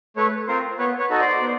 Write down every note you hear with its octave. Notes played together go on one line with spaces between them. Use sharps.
A3 B4 C#5
C4 F4 A#4 C5
B3 B4 C#5
B4 C#5
D#4 F#4 A4 D#5
C5 D5
B3